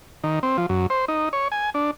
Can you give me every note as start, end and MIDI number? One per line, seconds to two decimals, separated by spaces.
0.24 0.39 51
0.43 0.57 60
0.58 0.66 53
0.69 0.87 42
0.90 1.05 72
1.08 1.29 63
1.33 1.48 73
1.52 1.70 80
1.74 1.91 62